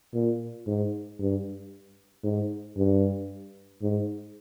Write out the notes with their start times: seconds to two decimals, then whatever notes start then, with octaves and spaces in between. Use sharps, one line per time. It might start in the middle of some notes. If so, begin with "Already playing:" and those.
0.14 A#2
0.67 G#2
1.19 G2
2.24 G#2
2.77 G2
3.82 G#2